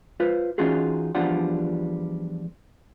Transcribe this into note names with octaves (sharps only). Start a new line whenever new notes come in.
F4 B4 C5
E3 C#4 D#4 F4 F#4 G#4
E2 F3 G3 D4 F4 F#5